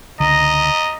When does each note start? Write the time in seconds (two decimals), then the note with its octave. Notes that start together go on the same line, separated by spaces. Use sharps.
0.20 C#2 D3 D#5 A#5